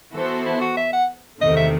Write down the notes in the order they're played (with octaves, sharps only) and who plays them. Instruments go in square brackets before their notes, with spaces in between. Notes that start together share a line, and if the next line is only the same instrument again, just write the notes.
[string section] E3 B3 F#4 A4 C5
[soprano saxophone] E4
F#4
E5
F#5
[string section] E2 C3 D#3 A3 [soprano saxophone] D#5
[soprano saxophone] E5